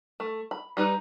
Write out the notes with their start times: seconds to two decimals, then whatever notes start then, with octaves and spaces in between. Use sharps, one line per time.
0.20 A3
0.51 B5
0.77 G3 D#4 B4